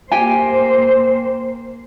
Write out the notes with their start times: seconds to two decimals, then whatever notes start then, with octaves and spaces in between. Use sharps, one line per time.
0.12 A#3 G4 C5 G5 G#5